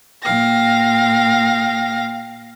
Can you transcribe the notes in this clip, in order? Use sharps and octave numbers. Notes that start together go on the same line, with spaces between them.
A#2 F5 G5 A#6